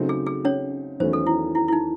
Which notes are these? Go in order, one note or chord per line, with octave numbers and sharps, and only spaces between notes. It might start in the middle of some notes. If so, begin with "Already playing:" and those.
Already playing: C#3 F#3 A3 C4 D#4
G#4
G#4
C#4 C#5
E2 D#3 F#3 A3 C#4 C5
A4
E4
E4
E4
D#4